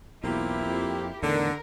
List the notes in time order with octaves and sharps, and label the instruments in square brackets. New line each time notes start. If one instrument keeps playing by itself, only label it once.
[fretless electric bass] B1 E2 [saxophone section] A#3 C4 F4 [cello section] E4 G4
[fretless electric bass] F2
[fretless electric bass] E2 A2 D#3 [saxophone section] D3 [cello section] A#4